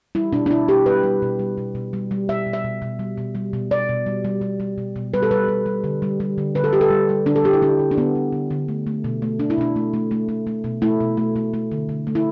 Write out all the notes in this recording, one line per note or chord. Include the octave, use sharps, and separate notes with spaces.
G3 E4
B2 D4
D4
B2 E4
B2 G4
G3 B4
G3
B2
G3
B2
B2
G3
G3
B2 E5
B2
E5
B2
B2
G3
B2
G3
B2
B2 D5
B2
G3
G3
G3
G3
B2
B2
G3 B4
A4
G3 B4
G3
G3
D3
G3
G3
D3
D3 B4
A4
G3 G4
A4
G3
G3
D3 D4
A4
G3 G4
E4
D3 D4
D3
D4
D3 B3
D3
D3
D3
A3
A3
B2
A3
B2 D4
E4
B2 D4
A3
A3
A3
A3
A3
B2
A3 E4
B2
A3
A3
A3
D3
D3
A3
E4